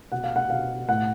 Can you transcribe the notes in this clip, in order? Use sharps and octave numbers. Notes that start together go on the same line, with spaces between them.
B2 F#5
F5
F#5
B2 F5
A2 F#5